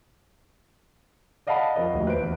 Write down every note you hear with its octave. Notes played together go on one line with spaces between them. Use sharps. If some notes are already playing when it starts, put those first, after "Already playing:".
D5 D#5 F5 F#5 A5 B5
F2 A#4 D#5
D#1 D2
B4 C5 D7
E2